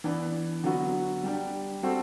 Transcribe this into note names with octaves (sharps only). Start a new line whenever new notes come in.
E3 B3 D4
D3 F#3 B3 F#4
G3 D4 G4
G3 C4 F#4 A4